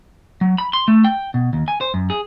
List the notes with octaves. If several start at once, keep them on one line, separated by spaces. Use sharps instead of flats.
F#3
B5
C6
A3
G5
B2
D#2
G#5
C5
F#2
G#4